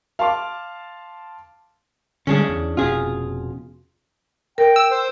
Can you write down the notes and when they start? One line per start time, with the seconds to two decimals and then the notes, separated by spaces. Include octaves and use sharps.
0.19 F5 A5 C6 D6
2.27 D3 G3 G#3 C#4 D4 G#4
2.49 E2
2.77 F1 B2 C#4 F4 G#4
4.58 A#4 G5
4.76 E6
4.91 C5